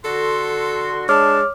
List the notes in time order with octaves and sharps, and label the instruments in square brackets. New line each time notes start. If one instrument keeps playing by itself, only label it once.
[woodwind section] D3 F#4 C6 [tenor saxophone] A4
[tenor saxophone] G#3 [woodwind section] D4 A5 [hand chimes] C#5 D6 F6